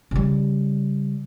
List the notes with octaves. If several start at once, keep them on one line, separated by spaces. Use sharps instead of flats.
C#3 G3